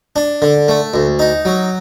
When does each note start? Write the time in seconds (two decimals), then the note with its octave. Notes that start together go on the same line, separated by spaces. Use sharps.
0.16 D4
0.42 D3
0.68 A3
0.94 D2
1.19 D#4
1.45 F#3